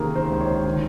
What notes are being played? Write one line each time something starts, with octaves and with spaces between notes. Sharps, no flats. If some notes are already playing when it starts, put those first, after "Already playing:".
Already playing: C3 D#3 A#3 G#4 A#4
C5
C#2 C5
C#5
D#3